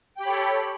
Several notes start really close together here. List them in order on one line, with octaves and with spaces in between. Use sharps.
G5 G4 B5 C#5 A4